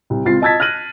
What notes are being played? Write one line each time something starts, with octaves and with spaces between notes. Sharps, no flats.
C2
C#2 C4 F4 A6 C7
D#5 A5 E6 G#6 A6 B6
F6 F#6 A#6 D#7 F#7